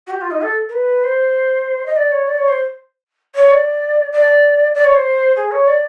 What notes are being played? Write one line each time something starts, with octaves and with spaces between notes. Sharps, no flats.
F#4
G4
F4
D#4
A4
A#4
B4
C5
D#5
D5
C#5
D5
C#5
C5
C#5
D5
D5
D5
C#5
C5
G#4
C#5
D5